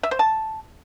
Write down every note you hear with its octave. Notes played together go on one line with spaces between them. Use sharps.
E5
C5
A5